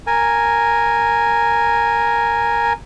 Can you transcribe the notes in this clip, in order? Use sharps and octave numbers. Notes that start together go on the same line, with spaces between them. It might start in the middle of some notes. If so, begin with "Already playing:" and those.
A#4 G#5